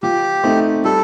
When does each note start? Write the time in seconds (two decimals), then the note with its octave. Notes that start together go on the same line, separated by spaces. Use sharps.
0.03 F3 G4
0.44 A3 C4 D#4
0.85 G3 A4